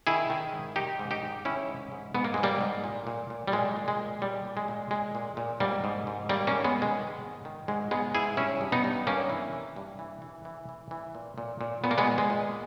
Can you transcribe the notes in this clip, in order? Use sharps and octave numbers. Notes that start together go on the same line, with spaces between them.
D#3 E4 G#4
D#3
G#2
D#3 D#4 G4
G#2
D#4 G4
G#2
D#3 C#4 E4
G#2
G#2
G#2 B3
A#3
G#2 G#3
G3 A#3
G#2
A#2
A#2
A#2
G3
A#2 G#3
A#2
G#3
A#2
A#2 G3
A#2
G#3
A#2
A#2 G#3
A#2
A#2
G#2 G3 A#3
G#2
G#2
D#3 G3 A#3
A#3 C#4
G#2
G#3 B3
G#2
G#3
D#3
G#2
D#3
G#2 G#3
G#2 G#3 B3
G#2 E4 G#4
G2 C#4 E4
G2
B3 D#4
G2
G2 A#3 C#4
E3
E3
G2
E3
E3
E3
E3
E3
A#2
A#2
A#2
A#2 B3
A#3
G#3 B3
A#2
G#3
A#2